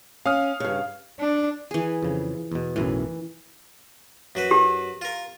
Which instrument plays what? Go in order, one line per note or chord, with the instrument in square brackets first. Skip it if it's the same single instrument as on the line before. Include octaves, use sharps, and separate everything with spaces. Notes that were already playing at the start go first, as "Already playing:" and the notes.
[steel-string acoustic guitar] C#4 [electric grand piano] F5 D#6 F6
[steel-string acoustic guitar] G2 C#3
[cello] D4
[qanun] E3 G#4
[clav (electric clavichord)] F2 C#3
E2 B2
[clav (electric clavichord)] B1 F#2 A2 [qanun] E3
[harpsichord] F#2 F#4 B4
[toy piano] G4
[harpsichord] F4 A#4